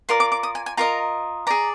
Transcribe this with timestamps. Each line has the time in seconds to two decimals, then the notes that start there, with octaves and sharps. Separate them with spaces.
0.09 F4 A#4 D5 C6
0.20 D6
0.32 D6
0.43 D#6
0.55 G#5
0.66 G#5
0.77 F4 A#4 D#5 A#5
1.47 G#4 D5 A#5